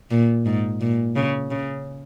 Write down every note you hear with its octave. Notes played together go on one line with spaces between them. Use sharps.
A#2
G#2
A#2
C#3
C#3